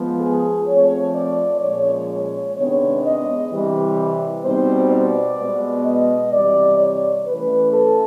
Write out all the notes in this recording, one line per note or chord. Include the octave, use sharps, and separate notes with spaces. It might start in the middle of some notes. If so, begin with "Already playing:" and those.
Already playing: F3 G#3 B3
G#4
F3 A3 C4 C#5
D5
A#2 F3 G#3 C#4 C#5
C#5
C3 D#3 G#3 B3 D4 C#5
D#5
C3 E3 G3 C4
B2 G3 C4 D#4 C5
D5
B2 G#3 B3
D#5
C3 E3 G3 D5
C#5
E3 A3 C#4 B4
A4